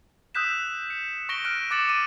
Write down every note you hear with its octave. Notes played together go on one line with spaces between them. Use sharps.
D#6 E6 F#6 G6 B6 E7
C#7
C#6 A#6 D7 G7
F6 F#6 D7
D6 F#6 A6 C#7 E7 F#7
D6 A6 D7 D#7